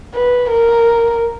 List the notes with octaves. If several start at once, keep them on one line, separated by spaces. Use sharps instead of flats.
B4
A#4